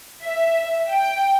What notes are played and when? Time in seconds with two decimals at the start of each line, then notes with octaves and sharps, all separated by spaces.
0.23 E5
0.89 G5